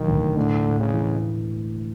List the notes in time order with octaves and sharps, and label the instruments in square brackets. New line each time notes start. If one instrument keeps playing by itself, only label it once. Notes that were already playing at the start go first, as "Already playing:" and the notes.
Already playing: [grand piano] E1 F#3 [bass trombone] D#3
[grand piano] D2
[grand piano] A2 [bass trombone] D3
[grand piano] A2
[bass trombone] C#3
[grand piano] E3